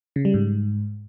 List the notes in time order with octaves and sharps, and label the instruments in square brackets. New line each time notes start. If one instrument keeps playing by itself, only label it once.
[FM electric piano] C#3
G3
G#2